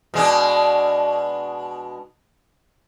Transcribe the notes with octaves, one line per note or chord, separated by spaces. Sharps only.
B2 G#3 D4